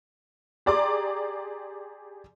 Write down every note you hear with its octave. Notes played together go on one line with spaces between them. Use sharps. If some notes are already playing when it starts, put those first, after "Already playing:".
G4 G#4 D5 A#5 C6 D6